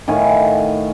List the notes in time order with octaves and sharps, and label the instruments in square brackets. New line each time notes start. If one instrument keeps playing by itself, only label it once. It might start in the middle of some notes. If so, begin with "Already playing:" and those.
[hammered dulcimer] A2 D#3 F5 G#5